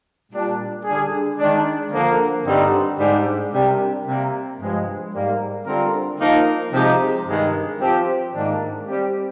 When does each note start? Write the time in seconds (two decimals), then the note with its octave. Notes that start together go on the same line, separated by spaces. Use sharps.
0.31 A#2 G3 D4
0.85 D3 G3 D4 G#4
1.38 D#3 G#3 D4
1.92 D3 F3 A#3
2.45 G2 D3 G3 C4 D#4
2.99 G#2 G3 D4 G4
3.53 C3 G3 D4 G4 A#4
4.06 C3 G3 A#3
4.59 G2 F3 G#3
5.13 G#2 G3 A#3
5.66 D3 G3 C4 F4 A#4
6.19 F3 A#3 D#4 A#4
6.72 C3 F3 G#3 D#4 G4
7.26 G2 D#3 G#3
7.80 F3 C4 G4
8.33 G#2 D#3 A#3 D4
8.86 G3 C4 G4